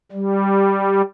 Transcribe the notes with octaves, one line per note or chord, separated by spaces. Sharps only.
G3